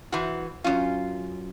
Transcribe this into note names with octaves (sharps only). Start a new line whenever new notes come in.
E3 F#4 C5
F#2 C#4 F4